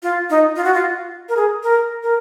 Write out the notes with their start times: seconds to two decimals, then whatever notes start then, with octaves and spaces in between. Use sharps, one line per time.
0.03 F4
0.30 D#4
0.56 F4
0.64 F#4
0.74 F4
1.29 A#4
1.36 G#4
1.63 A#4
2.03 A#4